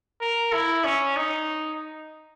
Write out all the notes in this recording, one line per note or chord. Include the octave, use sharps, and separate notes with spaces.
A#4
E4
C#4
D#4